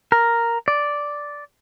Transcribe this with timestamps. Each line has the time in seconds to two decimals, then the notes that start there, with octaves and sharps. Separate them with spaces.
0.12 A#4
0.68 D5